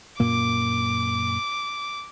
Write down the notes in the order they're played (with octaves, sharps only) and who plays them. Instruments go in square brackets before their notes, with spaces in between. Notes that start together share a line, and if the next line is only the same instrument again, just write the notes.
[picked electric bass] F#2 A#2 A#3 [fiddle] D6